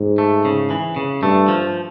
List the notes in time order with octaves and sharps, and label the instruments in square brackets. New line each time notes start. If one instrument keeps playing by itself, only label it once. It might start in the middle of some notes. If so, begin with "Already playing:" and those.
Already playing: [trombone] G#2
[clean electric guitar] A3
C#3
E3
C#3
[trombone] G2 [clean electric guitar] A3
[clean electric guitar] F3